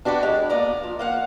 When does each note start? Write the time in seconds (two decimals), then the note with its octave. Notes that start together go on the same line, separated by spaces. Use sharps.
0.05 D4 F#4 G4 A4 B4 D5
0.23 G#3
0.50 A#3 B3 D5 A#5
0.83 F3
0.99 A#3 F5 F#5